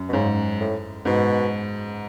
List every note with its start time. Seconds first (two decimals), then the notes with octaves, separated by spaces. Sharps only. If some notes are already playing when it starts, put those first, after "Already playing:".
Already playing: F#2
0.09 B2
0.13 G#2 C#3
0.60 A2
1.05 G#2 B2